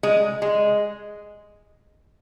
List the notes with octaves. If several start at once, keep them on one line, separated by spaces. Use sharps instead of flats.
G#3
G#3